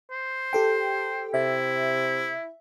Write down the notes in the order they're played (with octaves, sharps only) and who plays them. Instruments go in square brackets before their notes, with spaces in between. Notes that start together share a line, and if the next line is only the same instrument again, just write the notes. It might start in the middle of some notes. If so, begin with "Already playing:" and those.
[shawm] C5
[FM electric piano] G4 A4 G5
[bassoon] C3 [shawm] E4 [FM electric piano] E5